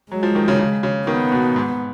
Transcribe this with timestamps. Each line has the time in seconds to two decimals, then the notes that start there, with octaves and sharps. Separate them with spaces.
0.11 F#3 G#3
0.23 F3
0.35 D#3
0.48 C#3
0.59 C#3
0.83 C#3
1.07 D#3 B3
1.32 B2
1.56 G#2